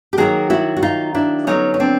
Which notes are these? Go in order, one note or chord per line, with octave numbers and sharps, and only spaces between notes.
G4
D#3 F#3 A#3 F#4 G#4
E4 F#4
F#4
D#4 F4
D4 E4
D3 F#3 B3 C#4 D#4
C#4
C4 D4